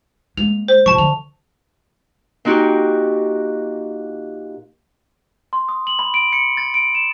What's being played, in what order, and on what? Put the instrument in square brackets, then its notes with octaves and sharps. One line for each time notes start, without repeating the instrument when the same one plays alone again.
[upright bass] G#3 A#3 [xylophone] F7
[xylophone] C5
[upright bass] C#3 F3 [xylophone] A5 C#6
[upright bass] D3 [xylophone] F7
[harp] A#2 D#4 F#4 G4
[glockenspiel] C6
D#6
F#7
B5
D7
C#7
A6
D7
E7